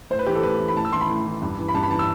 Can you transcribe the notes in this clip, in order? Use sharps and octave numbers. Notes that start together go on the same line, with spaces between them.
A2 C5
B4
E3 G4
A4
A2 B4
E3
B5
A2 A5
E6
E3 C6
B5
A2
E3
G2
E3
B5
G2 A5
B5
E3 A5
E6